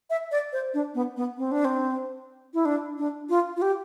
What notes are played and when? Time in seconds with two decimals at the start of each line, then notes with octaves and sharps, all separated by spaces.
0.10 E5
0.31 D5
0.53 C5
0.74 D4
0.95 B3
1.17 B3
1.38 C4
1.51 D4
1.65 C4
2.54 E4
2.65 D4
2.98 D4
3.29 F4
3.57 F4
3.62 G4